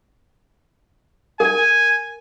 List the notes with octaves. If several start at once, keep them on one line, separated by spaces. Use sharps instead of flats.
A#4 G#5